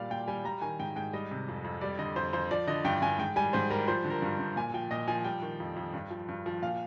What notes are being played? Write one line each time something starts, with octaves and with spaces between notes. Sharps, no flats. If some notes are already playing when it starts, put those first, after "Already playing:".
Already playing: A#2 G3 D5 F5
A#2 G5
G3 G#5
G3 A#5
D#3 G#5
G#2 G5
G#2 G5
G3 D#5
C3
F2
F2
G3 D5
D3 D#5
F2 C5
F2 C5
F3 D5
D3 D#5
G2 G5
G2 G#5
G#2 G5
G3 G#5
G#2 C5
G3 A#4
F3 C5
D3
A#4
G2
G2
A#2 G#5
F3 G5
A#2 D#5
F3 G#5
G3 G5
D#3
F2
F2
G2
F3
G2
F3
A#2 F5